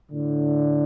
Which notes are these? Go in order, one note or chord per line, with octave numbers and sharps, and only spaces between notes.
A2 D3